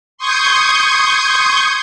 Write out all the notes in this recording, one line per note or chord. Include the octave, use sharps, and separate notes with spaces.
C6 C#6 D#6 G6 G#6